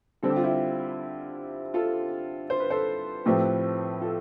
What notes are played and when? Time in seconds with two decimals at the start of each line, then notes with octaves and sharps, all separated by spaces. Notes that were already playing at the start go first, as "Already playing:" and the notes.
0.23 D3 G3 C4 A4
0.30 G4
0.36 F4
0.44 E4 G4
1.74 F4 A4
2.50 C5
2.60 B4
2.70 A4 C5
3.25 A2 F3 A3 C4 G4 B4
4.01 F4 A4